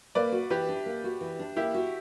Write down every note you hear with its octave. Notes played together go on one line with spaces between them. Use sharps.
A#3 B4 D5
F#4
E3 G4 B4
D4
A#3
F#4
E3
D4
A#3 E4 G4
F#4